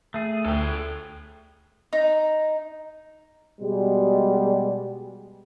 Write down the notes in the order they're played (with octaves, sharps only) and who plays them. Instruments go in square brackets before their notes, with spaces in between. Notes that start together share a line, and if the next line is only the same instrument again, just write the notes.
[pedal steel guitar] A3 G#4
[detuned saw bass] D2 [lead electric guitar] A4 G5
[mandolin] D#4
[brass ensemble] B2 G3 G#3